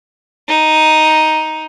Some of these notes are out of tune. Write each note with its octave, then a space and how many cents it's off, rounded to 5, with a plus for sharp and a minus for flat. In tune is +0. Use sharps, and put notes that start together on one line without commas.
D#4 +5